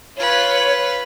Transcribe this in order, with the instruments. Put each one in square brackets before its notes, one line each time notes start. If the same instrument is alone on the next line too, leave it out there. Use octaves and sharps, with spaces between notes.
[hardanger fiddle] F4 B4 [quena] C#5